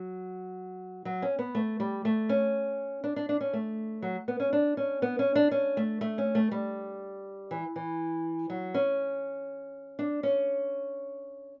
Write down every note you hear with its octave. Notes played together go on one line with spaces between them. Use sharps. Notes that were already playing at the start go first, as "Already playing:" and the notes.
Already playing: F#3
F#3
C#4
B3
A3
G3
A3
C#4
D4
D4
D4
C#4
A3
F#3
B3
C#4
D4
C#4
B3
C#4
D4
C#4
A3
A3
C#4
A3
G3
E3
E3
F#3
C#4
D4
C#4